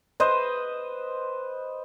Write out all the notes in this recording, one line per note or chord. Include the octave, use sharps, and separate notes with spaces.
B4 C5 D#5